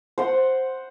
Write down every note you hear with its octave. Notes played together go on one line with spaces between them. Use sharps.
C5 F#5